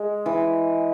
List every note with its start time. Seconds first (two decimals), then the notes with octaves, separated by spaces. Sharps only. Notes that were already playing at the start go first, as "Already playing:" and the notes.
Already playing: G#3
0.26 E3